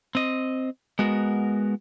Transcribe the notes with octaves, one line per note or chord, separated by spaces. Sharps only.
C4 D#5
G#3 B3 F#4 A#4